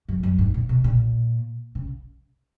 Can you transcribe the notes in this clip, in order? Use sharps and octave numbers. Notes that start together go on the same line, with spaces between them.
F#2
F#2
G#2
A#2
B2
A#2
C#3